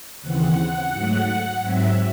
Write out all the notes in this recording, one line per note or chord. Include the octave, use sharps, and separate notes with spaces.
D#2 C#3 E3 C4 F#5
G#2 F#3 A3
G#2 F#3 C4 E5